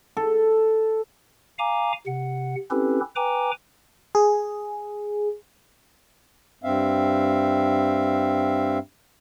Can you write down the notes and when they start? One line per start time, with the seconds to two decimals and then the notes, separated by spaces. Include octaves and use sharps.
0.17 A4
1.59 F5 G#5 A#5 D6
2.07 C3 F#5
2.71 C4 C#4 E4 G4 A4 B4
3.16 B4 G5 G#5 A#5 D6
4.15 G#4
6.64 G2 C4 E5 F5